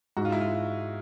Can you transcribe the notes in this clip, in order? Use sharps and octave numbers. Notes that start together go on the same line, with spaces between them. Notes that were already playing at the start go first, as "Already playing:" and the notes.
G#2 F#4
F4
E4
F4